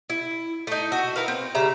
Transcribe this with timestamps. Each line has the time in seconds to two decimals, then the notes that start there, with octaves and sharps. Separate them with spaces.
0.10 E4
0.67 A3 D#4
0.92 F#4 E5
1.16 E4 A#4 B4 F5
1.28 C4
1.55 C#3 G3 E5 A#5